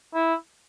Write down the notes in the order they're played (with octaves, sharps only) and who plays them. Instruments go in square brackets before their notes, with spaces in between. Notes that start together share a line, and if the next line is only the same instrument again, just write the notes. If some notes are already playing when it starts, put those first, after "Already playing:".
[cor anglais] E4